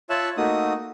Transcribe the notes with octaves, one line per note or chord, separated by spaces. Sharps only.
F4 C#5 E5 A5 E6 F#6
A3 A#3 D#4 F#4 D#6